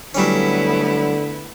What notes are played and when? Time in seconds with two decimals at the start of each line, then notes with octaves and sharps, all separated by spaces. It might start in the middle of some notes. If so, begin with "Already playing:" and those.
0.15 D3 F#3 G3 A3 B3 C#4 E4